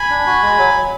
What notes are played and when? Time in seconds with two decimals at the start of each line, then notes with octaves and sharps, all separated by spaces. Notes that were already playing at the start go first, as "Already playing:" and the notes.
Already playing: G#5 B5
0.10 D4
0.26 F#4
0.42 G#3
0.58 F#3
0.74 F#3